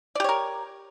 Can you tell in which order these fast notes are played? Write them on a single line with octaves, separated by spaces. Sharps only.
D5 G4 C#5 A#4